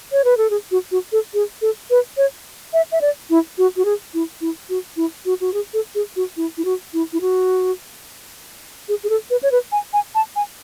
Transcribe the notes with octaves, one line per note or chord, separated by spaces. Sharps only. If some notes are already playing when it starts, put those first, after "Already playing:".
C#5
B4
A4
G#4
F#4
F#4
A4
G#4
A4
B4
C#5
E5
E5
D5
E4
F#4
F#4
G#4
E4
E4
F#4
E4
F#4
F#4
G#4
A4
G#4
F#4
E4
E4
F#4
E4
E4
F#4
G#4
G#4
A4
B4
C#5
B4
G#5
G#5
A5
G#5